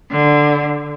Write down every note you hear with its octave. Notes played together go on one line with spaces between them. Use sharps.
D3